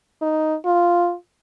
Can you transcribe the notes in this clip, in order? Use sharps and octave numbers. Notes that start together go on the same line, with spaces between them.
D#4
F4